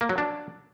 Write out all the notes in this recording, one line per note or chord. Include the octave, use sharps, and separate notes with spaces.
A#3
F#3
D4